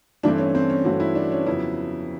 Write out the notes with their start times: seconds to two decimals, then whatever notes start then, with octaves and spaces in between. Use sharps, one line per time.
0.23 G2 E3 A3 C4 D4
0.38 C#4
0.55 C4
0.70 C#4
0.85 G2 E3 A3 C4 F#4
1.00 E4
1.15 D4
1.32 C#4
1.46 F2 C#3 F#3 B3 E4